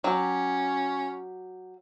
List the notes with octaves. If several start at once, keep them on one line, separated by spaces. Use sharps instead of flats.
F#3 C#4 G4